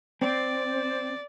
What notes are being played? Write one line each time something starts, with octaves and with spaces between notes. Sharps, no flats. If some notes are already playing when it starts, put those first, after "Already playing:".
C4 D5